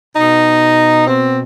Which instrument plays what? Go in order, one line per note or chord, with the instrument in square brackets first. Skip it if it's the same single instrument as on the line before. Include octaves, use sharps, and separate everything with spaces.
[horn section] B2 D#4
C4